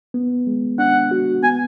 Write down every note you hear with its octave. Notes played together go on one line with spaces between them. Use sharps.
B3
G#3
D4 F#5
F#4
B3 G#5